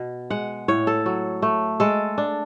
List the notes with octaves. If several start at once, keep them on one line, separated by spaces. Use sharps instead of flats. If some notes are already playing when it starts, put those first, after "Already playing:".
Already playing: B2
G#3 F#5
A2 C#5
A4
F#3
A3
G#3 A4
D4